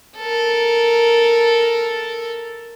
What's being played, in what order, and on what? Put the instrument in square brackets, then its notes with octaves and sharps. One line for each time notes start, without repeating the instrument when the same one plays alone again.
[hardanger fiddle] A4 A#4